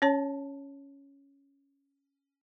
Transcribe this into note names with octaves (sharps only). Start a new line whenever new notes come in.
C#4 C#5 A5